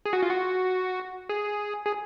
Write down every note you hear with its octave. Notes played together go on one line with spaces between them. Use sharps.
G#4
F#4
F4
F#4
G#4
G#4